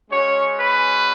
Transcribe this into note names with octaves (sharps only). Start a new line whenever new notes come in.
G#3 C#4 F#4 C#5
B4